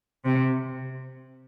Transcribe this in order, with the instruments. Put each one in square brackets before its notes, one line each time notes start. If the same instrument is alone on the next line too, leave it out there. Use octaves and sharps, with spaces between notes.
[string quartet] C3